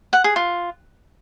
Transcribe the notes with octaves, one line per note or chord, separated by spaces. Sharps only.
F#5
G#4
F4